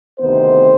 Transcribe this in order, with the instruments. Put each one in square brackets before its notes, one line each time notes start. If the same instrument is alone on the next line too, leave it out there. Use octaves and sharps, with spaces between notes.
[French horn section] D2 C3 D#3 B3 D#4 C5